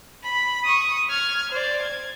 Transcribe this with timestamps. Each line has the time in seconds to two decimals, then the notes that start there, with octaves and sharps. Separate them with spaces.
0.24 B5
0.65 C#6 D#6
1.09 F6 G#6
1.52 C5 D5
1.82 G#6